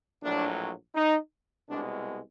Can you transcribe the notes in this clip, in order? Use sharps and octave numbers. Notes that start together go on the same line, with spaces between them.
A#1 A2 F#3 D4
D#4
C2 B2 G#3 D4